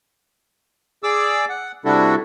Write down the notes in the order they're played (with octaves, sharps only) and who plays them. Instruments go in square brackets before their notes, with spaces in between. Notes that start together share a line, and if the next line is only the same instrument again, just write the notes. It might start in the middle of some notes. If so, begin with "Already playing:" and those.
[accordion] G#4 D5 D6 E6
F#5
C3 G3 D4 E4 F#4 A4